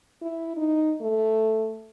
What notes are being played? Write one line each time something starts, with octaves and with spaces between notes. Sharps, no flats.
E4
D#4
A3